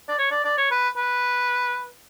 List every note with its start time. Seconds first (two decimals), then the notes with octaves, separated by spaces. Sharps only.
0.09 D5
0.19 C#5
0.31 D5
0.45 D5
0.58 C#5
0.71 B4
0.97 B4